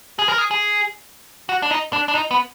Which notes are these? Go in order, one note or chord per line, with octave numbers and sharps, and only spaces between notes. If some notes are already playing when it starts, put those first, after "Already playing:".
G#4
A#4
G#4
G#4
F#4
D4
D#4
D4
D4
D#4
B3